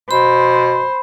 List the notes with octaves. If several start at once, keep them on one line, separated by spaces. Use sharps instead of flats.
B2 C5 B5